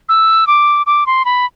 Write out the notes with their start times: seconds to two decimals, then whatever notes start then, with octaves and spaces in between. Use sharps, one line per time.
0.09 E6
0.47 D6
0.86 D6
1.06 C6
1.25 B5